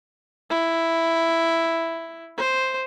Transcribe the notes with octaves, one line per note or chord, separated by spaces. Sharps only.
E4
C5